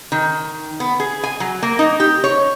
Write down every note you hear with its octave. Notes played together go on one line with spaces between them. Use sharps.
D#3
B3
G#4
G#5
F#3
A#3
D#4
G4
C#5